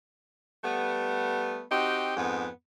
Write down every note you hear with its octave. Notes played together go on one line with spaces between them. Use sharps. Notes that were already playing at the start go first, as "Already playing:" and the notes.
G3 A3 B3
C4 D#4 F#4 G4
F2 G#2 B3